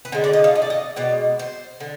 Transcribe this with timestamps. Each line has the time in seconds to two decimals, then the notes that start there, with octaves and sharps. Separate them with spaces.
0.05 B4
0.12 D3 G#3 C5
0.24 D5
0.33 D#5
0.44 F5
0.56 D#5
0.62 D5
0.70 D#5
0.96 B2 G#3 D5
1.39 C5
1.80 D3